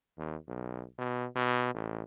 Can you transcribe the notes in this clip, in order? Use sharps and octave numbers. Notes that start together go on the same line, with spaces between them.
D#2
B1
B2
B2
A1